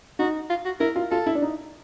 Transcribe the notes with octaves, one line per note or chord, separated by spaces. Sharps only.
D#4 F#4
F4
F#4
E4 A#4
F4
F4 A4
E4
D4
D#4